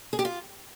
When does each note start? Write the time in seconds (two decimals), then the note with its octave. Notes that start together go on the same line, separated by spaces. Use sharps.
0.13 G#4
0.19 G4
0.25 F4